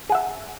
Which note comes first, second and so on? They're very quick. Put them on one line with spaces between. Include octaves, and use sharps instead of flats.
G#4 F#5 E5